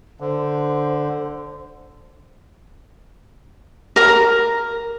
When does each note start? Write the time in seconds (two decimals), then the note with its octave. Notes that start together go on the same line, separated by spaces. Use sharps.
0.20 D3 C5
3.96 A#4 A#5